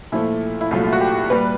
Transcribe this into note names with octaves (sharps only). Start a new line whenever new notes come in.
A#2 F3 A3 E4
E4
C2 A#2 F#3 A3 F4
F4
F#4
G4
A#2 G3 B4